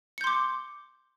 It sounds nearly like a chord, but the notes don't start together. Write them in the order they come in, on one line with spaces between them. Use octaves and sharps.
C#7 G6 C6 D6